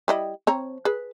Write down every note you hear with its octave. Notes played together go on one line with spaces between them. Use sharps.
G3 E4 D#5
C4 C#5 A#5
G#4 B4